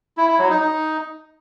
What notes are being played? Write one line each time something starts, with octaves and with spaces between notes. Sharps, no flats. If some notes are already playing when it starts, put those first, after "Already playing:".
E4
E4
F#3
D#4
D#4